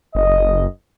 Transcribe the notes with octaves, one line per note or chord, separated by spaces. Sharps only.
F#1 D#5